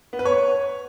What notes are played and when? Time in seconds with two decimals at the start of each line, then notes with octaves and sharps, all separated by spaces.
0.13 B3
0.19 B4
0.25 C#5